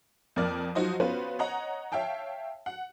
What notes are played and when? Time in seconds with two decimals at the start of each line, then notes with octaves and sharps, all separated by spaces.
0.36 F2 A#3 A#4 D5 F6
0.75 F3 F#3 D#4 F#4 C5 D#5
1.00 B3 C#4 F4 F#4 B4 C5
1.39 C#5 D#5 F#5 A#5
1.92 C#5 E5 F5 G5 A5
2.66 F#5